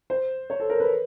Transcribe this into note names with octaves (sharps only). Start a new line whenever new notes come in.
C5
C#5
A4
A#4
B4